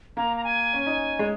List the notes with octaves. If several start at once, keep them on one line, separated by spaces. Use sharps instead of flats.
A#3 A#5
A#5
G#5
C#4
D#4
G#3